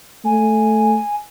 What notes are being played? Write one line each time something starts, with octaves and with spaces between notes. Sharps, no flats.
A3 G#5